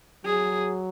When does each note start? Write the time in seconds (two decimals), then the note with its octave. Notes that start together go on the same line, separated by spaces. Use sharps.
0.25 F#3 G#4